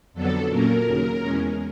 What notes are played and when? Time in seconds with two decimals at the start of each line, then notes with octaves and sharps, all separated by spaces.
0.13 F2 D3 F#3 B3 D4 A4
0.49 A#2 F#3 A#3 C#4 A#4
0.85 D#2 C#3 F#3
1.21 E2 B2 G#3 C#4